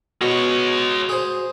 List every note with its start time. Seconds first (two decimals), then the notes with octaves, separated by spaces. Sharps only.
0.21 B2 G#3 F#4 C#5
1.09 G#4 C5